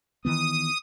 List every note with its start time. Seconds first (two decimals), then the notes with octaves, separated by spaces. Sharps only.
0.25 D#3 E3 B3 D#6